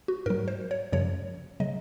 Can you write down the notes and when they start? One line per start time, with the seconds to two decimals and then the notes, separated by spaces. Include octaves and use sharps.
0.08 F#4
0.26 G#2 F#3 A#4
0.48 C5
0.71 C#5
0.93 F#2 C#3 F3 C#5
1.60 C#3 F#3 D#5